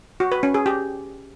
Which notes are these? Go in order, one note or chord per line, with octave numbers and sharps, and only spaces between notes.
F#4
B4
C#4
G#4
G4